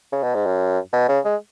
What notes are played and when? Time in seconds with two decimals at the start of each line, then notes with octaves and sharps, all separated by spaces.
0.12 C#3
0.23 B2
0.35 G#2
0.46 F#2
0.93 B2
1.09 C#3
1.24 G#3